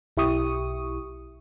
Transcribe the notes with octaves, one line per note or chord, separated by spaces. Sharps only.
B1 E4 G4 C#6 D#6